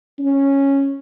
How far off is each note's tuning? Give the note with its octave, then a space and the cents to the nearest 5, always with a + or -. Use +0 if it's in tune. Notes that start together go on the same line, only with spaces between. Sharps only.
C#4 -5